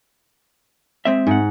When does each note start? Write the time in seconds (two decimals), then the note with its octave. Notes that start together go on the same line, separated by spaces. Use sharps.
1.05 G#3 C4 E5
1.27 G#2 F#5